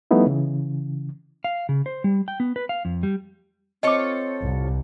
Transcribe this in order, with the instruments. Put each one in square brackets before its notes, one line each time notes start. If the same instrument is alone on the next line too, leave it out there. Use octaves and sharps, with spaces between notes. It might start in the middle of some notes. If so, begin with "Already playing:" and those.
[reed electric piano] F3 G3 A3 B3 D#4 E4
C#3 E3
[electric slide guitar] F5
C#3
C5
G3
G5
B3
B4
F5
F2
G3
[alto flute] C4 [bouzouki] F4 A4 C#5 [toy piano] D#5 D6
[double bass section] C2